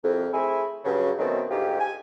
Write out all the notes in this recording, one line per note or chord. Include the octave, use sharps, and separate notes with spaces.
C2 F2
A3 C4 E4 G#4 G#5
G2 C#3 F#3
B2 D#3 F#3 A3 C4 C#4
D2 G#2 F4 G4
G#5